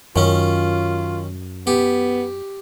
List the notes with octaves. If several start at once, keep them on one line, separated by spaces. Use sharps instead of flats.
F#2 D#3 C#4 F4
B3 G4